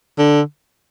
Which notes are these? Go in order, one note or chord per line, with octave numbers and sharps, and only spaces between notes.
D3